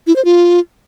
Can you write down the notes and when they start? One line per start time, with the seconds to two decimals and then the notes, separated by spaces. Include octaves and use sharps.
0.07 E4
0.16 C5
0.25 F4